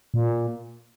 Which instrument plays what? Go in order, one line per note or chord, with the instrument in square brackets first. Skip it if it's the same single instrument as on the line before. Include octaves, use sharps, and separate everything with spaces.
[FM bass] A#2